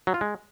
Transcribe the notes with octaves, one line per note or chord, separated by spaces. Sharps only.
F#3
F4
G#3